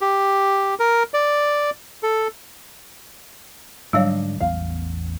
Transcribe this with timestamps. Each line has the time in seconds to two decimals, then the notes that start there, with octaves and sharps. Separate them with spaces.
0.01 G4
0.80 A#4
1.14 D5
2.03 A4
3.93 G#2 D3 F#3 G3 D4 C#5 D#5 F5
4.40 A1 E2 B3 F5